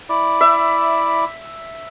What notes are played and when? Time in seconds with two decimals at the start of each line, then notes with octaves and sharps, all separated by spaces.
0.09 E4 D5
0.41 E5